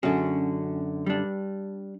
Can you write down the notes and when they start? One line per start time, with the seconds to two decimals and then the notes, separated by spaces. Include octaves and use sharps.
0.03 F#2 D3 C#4 F#4 G#4
1.06 G3 D4